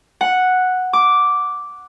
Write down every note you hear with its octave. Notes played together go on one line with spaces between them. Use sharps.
F#5
D6